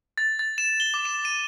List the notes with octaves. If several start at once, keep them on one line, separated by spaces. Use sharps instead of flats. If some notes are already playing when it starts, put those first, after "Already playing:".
A6
A6
E7
G7
D6
E7
D#7